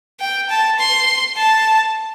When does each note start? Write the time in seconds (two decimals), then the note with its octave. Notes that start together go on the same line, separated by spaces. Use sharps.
0.20 G5
0.50 A5
0.79 C6
1.37 A5